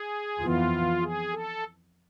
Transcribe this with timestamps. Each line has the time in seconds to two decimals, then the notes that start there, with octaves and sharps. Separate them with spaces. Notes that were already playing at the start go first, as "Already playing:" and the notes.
Already playing: G#4
0.39 F2 E3 B3 F4
1.02 G#4
1.32 A4